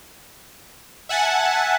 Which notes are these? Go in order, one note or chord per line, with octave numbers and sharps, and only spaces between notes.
E5 F#5 G#5 A5